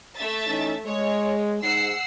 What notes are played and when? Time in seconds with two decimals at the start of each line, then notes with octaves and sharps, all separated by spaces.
0.15 A3 E5 A6
0.46 E3 C#4 D#4
0.85 G#3 C#5
1.63 G#2 F#5 E6 C7